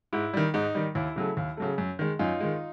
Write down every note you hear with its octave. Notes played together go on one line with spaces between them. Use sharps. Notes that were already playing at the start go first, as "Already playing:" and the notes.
G#2 E4
D#3 G3
G#2 D#4
D#3 G3
D#2 E4
C#3 F#3 A3
D#2
C#3 F#3 A3
F#2
D#3 G#3
F#2 D#4 F4
D#3 G#3